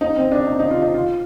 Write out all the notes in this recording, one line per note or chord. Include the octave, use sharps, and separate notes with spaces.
D#4
C4
D4
D#4
D#4
F4
D#4
F4